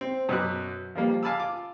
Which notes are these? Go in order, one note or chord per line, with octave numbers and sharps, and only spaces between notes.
C4
F#2 B2 B3 F#4 D6 F#6
F3 G3 A#3
F5 G#5 A5 B5 D6 E6
F4 D6